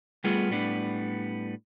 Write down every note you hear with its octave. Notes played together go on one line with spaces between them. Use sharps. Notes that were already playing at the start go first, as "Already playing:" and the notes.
G3 A3 B3 F4 G#4
A2 G3 B3 D4